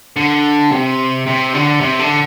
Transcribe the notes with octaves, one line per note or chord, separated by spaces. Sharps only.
D3
C3
C3
D3
C3
D3